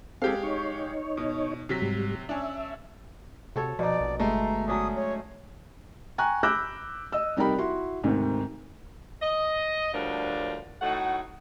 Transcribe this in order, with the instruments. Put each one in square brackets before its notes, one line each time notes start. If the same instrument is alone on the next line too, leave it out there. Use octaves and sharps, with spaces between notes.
[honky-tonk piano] G#3 G4 F5 [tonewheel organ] C4 A4
[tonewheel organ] D#4 C#5
[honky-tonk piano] B2
C3 F#3 B6
[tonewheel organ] G#2 G3
[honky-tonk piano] C#4 D4 [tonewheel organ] E5
[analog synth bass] C3 [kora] F#4 A4 C#5
[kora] B2 D#4 [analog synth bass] F3 [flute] D5
[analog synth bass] A#1
[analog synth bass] G1 [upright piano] G#3 A3 [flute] A#5
[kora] F#3 C#4 D4 [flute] D#6
[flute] C#5
[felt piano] G5 G#5 A#5 C#6 F#6
B5 D6 E6 F#6 G6 A#6
D#5 E6
C3 G3 D#4 A#4 G5 B5
E4 F#4 C6
D2 G#2 C3 D#3
[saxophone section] D#5
D2 A2 F3 G3 D4 A#4
A2 A3 D#4 F#4 A4 F#5